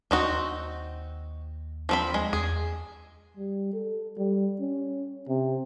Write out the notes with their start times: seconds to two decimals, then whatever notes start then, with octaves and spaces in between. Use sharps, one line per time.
0.11 D#2 C4 D#4 F#4
1.89 F3 C4 B5
2.14 G#3
2.33 E2 G#4
3.37 G3
3.74 A4
4.17 G3
4.60 C#4
5.28 C3